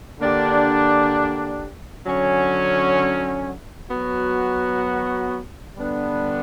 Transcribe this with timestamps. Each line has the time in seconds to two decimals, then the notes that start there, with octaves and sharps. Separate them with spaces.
0.19 D3 A#3 D4 G4
2.05 D3 F#3 C#4
3.90 F#3 B3 F#4
5.75 D3 G3 B3 D4